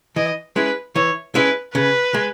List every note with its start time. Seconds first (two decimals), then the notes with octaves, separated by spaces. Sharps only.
0.16 E3 D#5
0.56 G#3 C#4 E4 B4
0.96 E3 C#5
1.35 G#3 C#4 E4 B4
1.75 C#3 B4
2.14 G#3